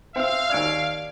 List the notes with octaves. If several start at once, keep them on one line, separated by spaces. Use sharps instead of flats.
C4 E5 F5 E6
D#2 D5 E6 F6 G#6 D7